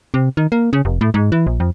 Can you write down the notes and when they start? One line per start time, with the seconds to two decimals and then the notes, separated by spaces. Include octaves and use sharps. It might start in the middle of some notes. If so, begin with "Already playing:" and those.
0.14 C3
0.37 D#3
0.52 A#3
0.73 C#3
0.85 F1
1.01 A2
1.14 G#2
1.32 E3
1.47 A#1
1.60 F2